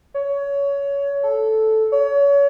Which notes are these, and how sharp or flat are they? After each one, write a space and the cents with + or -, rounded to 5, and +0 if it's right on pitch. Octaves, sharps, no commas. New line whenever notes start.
C#5 +20
A4 -5
C#5 +30